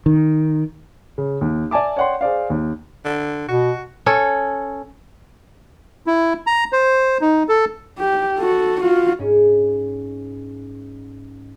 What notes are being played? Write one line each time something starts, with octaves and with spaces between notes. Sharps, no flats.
D#3
C#3
D#2
D5 E5 G#5 A5 D6
C#5 D5 F#5 G5 C6
G#4 C5 D5 F5
D#2
D3
B2 F#4
C#4 A4 C#5
E4
A#5
C5
D#4
A4
G4
F#4 A4
F4 F#4
G#2 C#4